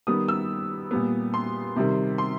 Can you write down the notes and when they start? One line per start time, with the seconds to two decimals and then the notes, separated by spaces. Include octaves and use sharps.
0.07 D#3 G3 B3 D#6
0.28 E6
0.91 A#2 G3 B3
1.34 C6
1.76 C3 D#3 G3
2.18 C6